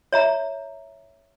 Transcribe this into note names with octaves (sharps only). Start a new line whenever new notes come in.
C#5 E5 A#5